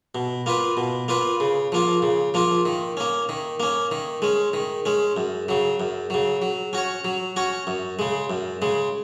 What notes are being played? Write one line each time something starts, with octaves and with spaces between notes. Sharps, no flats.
B2
A#3 F4 B4
B2
A#3 F4 B4
C#3
F3 A#3 F4
C#3
F3 A#3 F4
D#3
A#3 C#4
D#3
A#3 C#4
D#3
G#3 C#4
D#3
G#3 C#4
F#2
C#3 F#3
F#2
C#3 F#3
F#3
C#4 F#4 C#5
F#3
C#4 F#4 C#5
F#2
C#3 G#3
F#2
C#3 G#3